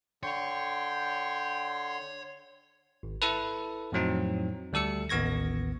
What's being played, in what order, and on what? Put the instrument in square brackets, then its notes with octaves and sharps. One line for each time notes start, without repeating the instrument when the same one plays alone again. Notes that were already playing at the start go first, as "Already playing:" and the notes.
[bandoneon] D3 C6 [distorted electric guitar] C#5 [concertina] G5
[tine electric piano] G#1
E4 A4 B4
F2 A2 F#3 C4 D#4
D2 G3 A4 E6 C#7
A1 D#2 B3 C#6 G#6 A#6